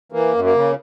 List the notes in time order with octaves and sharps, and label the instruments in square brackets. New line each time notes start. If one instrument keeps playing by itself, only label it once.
[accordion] E3 A#3
F#2
A#3
C#3